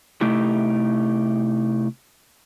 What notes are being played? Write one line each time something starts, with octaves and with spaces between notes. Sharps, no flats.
C3 A3 D#4 E4 G4